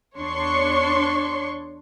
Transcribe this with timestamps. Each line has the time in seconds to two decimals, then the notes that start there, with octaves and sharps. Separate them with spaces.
0.17 E2 D4 C#5 C6 C#6